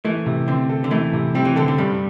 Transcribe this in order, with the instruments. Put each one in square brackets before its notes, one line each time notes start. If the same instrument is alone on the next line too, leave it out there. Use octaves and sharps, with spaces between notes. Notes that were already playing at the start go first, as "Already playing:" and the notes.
[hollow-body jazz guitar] E3 [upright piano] A3
[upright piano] C3
[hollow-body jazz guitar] D3 [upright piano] C4
[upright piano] A4
[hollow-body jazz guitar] D3
[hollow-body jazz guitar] E3 [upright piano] A3
[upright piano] C3
[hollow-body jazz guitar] G3 [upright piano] C4
[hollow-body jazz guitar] E3
[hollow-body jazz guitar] D3 [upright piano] A4
[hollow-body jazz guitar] D3
[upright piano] G2 [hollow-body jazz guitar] G3